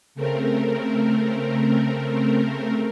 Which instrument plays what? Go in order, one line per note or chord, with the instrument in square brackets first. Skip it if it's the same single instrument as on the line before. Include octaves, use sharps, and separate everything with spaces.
[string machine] C#3 A3 C4 A#4